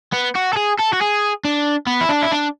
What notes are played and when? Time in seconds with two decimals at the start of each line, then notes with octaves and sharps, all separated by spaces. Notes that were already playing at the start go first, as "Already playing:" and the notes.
0.13 B3
0.36 F#4
0.53 A4
0.56 G#4
0.79 A4
0.93 F#4
1.01 G#4
1.45 D4
1.87 B3
2.01 E4
2.09 D4
2.23 E4
2.32 D4